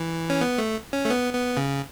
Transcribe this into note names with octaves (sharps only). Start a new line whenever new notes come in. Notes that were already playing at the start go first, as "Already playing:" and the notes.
Already playing: E3
C#4
B3
A3
C#4
A3
B3
B3
C#3